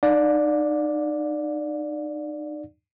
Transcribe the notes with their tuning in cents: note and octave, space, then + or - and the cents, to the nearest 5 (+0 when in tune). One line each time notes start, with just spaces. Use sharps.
D#4 -35 D5 +0 F5 +45